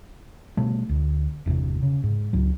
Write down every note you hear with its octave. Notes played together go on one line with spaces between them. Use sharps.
B2 G3 A3
D2
G1 E2 G2 C3
C#3
G#2
C#2 F#3